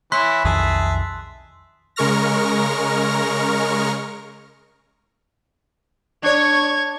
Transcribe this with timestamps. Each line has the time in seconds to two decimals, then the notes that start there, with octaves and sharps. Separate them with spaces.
0.12 E3 E4 C#5 C6 F#6 B6
0.45 B1 F2 D#3 G#4 E5 A5
1.96 C#3 G#3 A#4 C#6 F6 A#6
6.23 D4 C#5 C#6 G#6